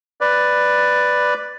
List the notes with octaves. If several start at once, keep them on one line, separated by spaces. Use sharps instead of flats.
B4 D5